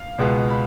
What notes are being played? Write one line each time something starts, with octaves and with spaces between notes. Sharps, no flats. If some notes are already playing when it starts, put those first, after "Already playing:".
Already playing: F5
C#2 B2 G#3 B3
B5